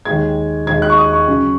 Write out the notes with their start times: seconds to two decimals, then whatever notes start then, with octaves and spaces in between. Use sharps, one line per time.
0.05 D#2 D#3 G#3 G#6
0.67 D#2 D#3 G#3 G#6
0.82 F#6
0.90 C#6
0.98 D#6
1.13 C#6
1.28 F#2 C#3 F#3 C#4